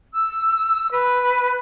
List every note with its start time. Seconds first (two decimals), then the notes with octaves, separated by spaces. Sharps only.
0.15 E6
0.91 B4